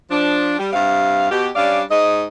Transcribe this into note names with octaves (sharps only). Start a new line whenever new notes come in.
F3 D4
G3
G2 C3 F5
B2 G4
G3 C#4 D4 D5 F5
G#2 D#4 D#5